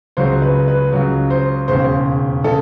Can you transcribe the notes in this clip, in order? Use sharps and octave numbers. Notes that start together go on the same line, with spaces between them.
C#2 C#3 F#3 C5
B4
B4
C#2 C#3 F#3
C5
E1 D#2 C#3 C5
C#3 A4